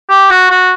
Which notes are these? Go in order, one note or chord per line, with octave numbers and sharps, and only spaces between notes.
G4
F#4
F#4